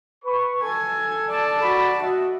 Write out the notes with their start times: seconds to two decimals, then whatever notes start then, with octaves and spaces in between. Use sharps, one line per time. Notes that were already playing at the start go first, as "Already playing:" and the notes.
0.24 B4 C#6
0.62 A4 G#5
1.30 D5 A5
1.61 F#4 B5
2.02 A3 F#4 D#5 E5